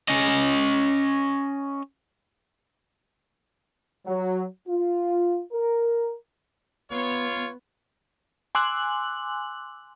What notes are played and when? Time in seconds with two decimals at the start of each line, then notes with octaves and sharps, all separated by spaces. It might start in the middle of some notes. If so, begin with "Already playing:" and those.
0.09 C#4 D#5
4.06 F#3
4.68 F4
5.52 A#4
6.91 B3 F4 C#5
8.55 G#5 C6 D6 E6 F#6 F#7